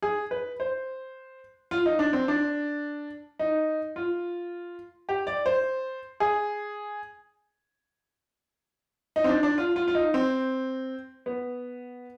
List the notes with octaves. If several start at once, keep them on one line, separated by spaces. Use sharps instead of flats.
G#4
B4
C5
F4
D#4
D4
C4
D4
D#4
F4
G4
D5
C5
G#4
D#4
C4
D4
D4
F4
F4
F4
D#4
C4
B3